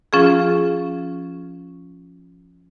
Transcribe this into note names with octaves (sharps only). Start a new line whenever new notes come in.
F3 C#4 F4 G#4